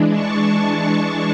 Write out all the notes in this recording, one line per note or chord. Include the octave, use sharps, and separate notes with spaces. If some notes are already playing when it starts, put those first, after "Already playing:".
Already playing: E3 G#3 D4
A5 C#6